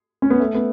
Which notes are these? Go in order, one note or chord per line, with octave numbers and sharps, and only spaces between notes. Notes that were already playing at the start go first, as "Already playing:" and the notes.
C#4
B3
A3
B3